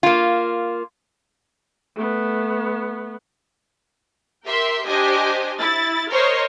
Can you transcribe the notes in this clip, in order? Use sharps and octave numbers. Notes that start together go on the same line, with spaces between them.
A#3 F4
A3 B3
G4 A#4 E5 C6
D4 G4 C5 D#5 G#5
E4 A6
A#4 C5 C#5 D#5 C6